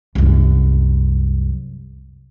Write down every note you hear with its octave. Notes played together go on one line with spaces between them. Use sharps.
C2 F#2